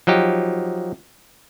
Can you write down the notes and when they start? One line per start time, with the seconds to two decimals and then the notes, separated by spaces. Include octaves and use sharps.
0.07 F3 F#3 D#4 G4